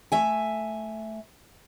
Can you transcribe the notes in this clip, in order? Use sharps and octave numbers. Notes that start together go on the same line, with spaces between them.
A3 E5 G#5